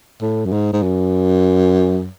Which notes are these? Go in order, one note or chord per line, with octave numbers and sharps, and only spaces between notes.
A2
F#2
G#2
G#2
F#2